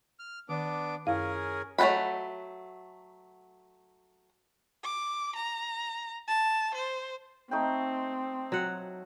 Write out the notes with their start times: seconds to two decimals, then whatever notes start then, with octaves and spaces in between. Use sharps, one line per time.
0.19 F6
0.49 D#3 B3 D4 D6
1.07 F#2 C#4 E4 G#4 A#4 F5
1.78 F#3 A3 C5 F#5 B5
4.84 D6
5.36 A#5
6.28 A5
6.75 C5
7.51 A3 C4 D#4 G5
8.52 F#3 F#5